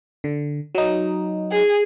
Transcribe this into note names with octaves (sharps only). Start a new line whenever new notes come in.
D3
F#3 D#4
G#4